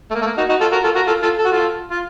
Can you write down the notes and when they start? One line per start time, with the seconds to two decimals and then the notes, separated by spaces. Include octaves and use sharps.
0.11 A3
0.15 A#3
0.21 A3
0.26 A#3
0.38 D#4 F#4
0.49 D#4 F#4
0.61 F4 A4
0.72 F#4 A#4
0.84 F4 A4
0.95 F#4 A#4
1.07 F4 A4
1.22 F4 A4
1.38 A4
1.45 F#4
1.52 F4 A4
1.91 F4